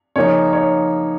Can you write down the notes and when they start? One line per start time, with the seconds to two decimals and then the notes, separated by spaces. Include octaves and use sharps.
0.16 C#3 F3 A#3 D#4 C#5
0.53 C#5